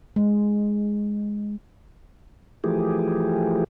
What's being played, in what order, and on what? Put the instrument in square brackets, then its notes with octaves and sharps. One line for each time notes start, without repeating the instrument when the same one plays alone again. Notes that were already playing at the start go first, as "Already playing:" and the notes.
[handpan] G#3
[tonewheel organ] E3 F3 A3 G4 G#4